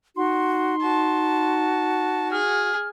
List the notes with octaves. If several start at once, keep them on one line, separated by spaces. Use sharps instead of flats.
D#4 F#4 C6
F#4 A5
G#4 F6